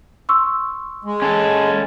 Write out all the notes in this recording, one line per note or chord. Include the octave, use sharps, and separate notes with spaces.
C6 C#6 E6
G#3
C#4 A4